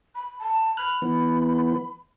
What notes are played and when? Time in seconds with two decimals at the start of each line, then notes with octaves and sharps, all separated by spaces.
0.15 B5
0.39 A5
0.77 B5 F6 F#6
1.02 E3 B3